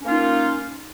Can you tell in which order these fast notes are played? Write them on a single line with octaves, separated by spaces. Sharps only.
C#4 A#3 F4 D#4